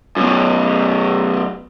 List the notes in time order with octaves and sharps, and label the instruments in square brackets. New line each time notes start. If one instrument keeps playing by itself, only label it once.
[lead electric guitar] F#2 B2